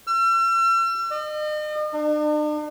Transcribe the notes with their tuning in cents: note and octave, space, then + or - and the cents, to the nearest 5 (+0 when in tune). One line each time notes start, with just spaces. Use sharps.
E6 +45
D#5 -40
D4 +45